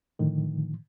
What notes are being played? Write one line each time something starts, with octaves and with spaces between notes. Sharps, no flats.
A2 D3 D#3 F3